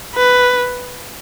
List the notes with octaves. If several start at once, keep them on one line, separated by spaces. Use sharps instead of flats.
B4